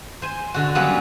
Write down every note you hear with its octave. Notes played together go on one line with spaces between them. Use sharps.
C5 G#5
D3 F#4
F#3 G3 A#3 B3 C#4 B4